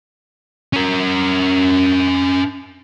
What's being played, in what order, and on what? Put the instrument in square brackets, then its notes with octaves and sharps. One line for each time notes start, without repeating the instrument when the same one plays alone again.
[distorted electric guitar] C#4 A#4